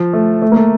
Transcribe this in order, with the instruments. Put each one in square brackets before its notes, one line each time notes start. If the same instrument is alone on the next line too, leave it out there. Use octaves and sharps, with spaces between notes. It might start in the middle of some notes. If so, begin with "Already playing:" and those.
Already playing: [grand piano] F3
A3
A3
A#3
A3